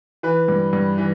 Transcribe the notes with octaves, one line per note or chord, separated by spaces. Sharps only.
E3 B4
G2
G2
E3